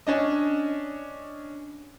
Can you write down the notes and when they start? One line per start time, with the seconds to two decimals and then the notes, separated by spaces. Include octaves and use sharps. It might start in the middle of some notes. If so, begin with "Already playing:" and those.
0.07 C#4 D4 D#5